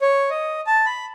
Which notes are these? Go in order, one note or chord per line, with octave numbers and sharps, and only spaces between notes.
C#5
D#5
A5
B5